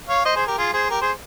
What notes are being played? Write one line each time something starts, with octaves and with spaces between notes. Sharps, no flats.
C#5 F5
C5 D#5
G#4 C5
G4 A#4
F4 G#4
G#4 C5
G4 A#4
G#4 C5